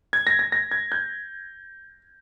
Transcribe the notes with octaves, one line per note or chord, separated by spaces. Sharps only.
G#6
A#6
A#6
A#6
G#6
G6